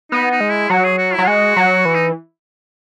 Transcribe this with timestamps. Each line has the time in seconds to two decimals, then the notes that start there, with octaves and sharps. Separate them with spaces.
0.11 B3 D#4
0.31 D#4
0.41 G#3
0.50 E4
0.70 F#3 F#4
0.85 G#4
0.98 F#4
1.14 F#3 E4
1.28 G#3 F#4
1.56 F#3
1.85 E3
1.95 D#4